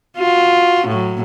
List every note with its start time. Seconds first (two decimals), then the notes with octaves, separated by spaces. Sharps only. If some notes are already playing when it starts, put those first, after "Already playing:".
0.18 F4 F#4
0.87 A2 F#3